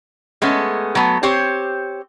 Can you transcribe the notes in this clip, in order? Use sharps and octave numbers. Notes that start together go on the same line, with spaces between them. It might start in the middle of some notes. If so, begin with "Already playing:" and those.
G#3 A3 B3 C#4
F#3 A3 B3
C4 G4 C5 C#5